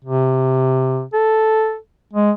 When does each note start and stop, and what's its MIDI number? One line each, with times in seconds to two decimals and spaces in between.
0.04 1.04 48
1.13 1.77 69
2.13 2.31 56